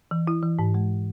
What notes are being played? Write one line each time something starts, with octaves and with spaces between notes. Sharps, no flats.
E3
E4
E3
G#2
G#3